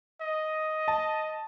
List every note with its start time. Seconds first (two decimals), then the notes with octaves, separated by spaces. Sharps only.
0.21 D#5
0.88 A5